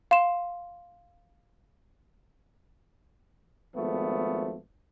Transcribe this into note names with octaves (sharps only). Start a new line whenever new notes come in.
F5 C6 E7
G#1 F3 A3 B3